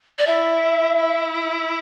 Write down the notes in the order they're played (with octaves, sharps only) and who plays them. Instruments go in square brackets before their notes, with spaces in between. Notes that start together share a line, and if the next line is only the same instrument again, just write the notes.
[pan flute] D5
[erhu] E4 [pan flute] E5
[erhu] E4